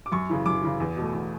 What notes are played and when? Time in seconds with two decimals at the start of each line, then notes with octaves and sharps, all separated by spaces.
0.06 D6
0.12 F#2 C#6
0.29 C#3 E3
0.46 F#2 D6
0.62 C#3 E3
0.80 E2
0.97 B2 A3
1.13 E2